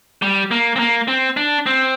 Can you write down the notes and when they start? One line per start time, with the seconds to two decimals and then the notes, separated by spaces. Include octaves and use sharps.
0.22 G3
0.51 A#3
0.76 C4
0.79 A#3
1.08 C4
1.37 D4
1.66 C4